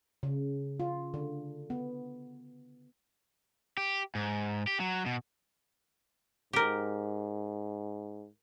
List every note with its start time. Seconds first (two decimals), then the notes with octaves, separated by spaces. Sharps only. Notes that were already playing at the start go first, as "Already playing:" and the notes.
0.23 C#3
0.80 F4
1.14 D3
1.70 B3
3.77 G4
4.15 G#2
4.67 G4
4.80 F#3
5.06 B2
6.53 G#2 G4 A#4